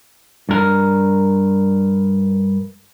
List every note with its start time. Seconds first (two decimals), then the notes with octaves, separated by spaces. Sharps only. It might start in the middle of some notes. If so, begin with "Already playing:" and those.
0.49 G2 A#4